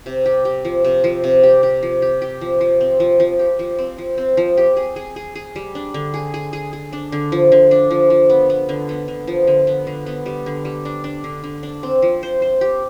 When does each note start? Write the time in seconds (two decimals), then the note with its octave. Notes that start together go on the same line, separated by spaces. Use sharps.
0.06 C3
0.26 G4
0.45 G4
0.65 F3
0.84 C3
1.04 F3
1.24 C3
1.43 G4
1.63 G4
1.83 F3
2.02 G4
2.22 G4
2.41 F3
2.61 F3
2.80 C4
3.00 F3
3.20 F3
3.39 G4
3.59 F3
3.79 C4
3.98 F3
4.18 C4
4.37 F3
4.57 G4
4.77 G#4
4.96 G#4
5.16 G#4
5.35 G#4
5.56 G3
5.75 D4
5.94 D3
6.14 G#4
6.34 G#4
6.53 G#4
6.73 G#4
6.93 D4
7.12 D3
7.32 F3
7.52 D3
7.71 D4
7.91 F3
8.10 F3
8.30 B3
8.50 B3
8.69 D3
8.89 B3
9.08 D3
9.28 F3
9.47 D3
9.67 B3
9.87 D3
10.06 B3
10.26 G3
10.46 D3
10.65 G3
10.85 D4
11.04 D4
11.24 D3
11.44 D3
11.63 D4
11.83 C4
12.02 F3
12.23 C5
12.42 C5
12.61 G4